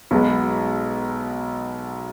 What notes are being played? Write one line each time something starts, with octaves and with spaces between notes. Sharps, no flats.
B1 B2 G#3 B3